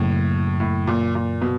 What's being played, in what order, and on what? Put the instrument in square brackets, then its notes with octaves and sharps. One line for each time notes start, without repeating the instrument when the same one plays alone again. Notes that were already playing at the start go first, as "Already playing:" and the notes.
Already playing: [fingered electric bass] F#2 C#3 F#3 A#3 [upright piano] A2
[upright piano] A2
A#2
A#2
B2